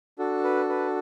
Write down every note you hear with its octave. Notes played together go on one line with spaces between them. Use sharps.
D4 F#4 A4
B4
B4